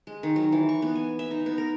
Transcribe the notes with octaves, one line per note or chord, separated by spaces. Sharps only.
G#3
D#3
F#3
E3
C#6
B3
G#5
E5
D#4
B3
A#4